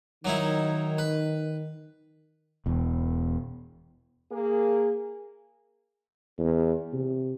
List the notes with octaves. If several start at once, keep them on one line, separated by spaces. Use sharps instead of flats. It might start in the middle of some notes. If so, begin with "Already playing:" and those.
D#3 F#3 D#4 E4
B4
E1 E2
A#3 G#4
E2
C3